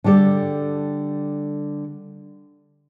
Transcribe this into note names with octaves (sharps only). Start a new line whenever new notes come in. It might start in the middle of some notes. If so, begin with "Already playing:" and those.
D3 G3 G4 A4 D5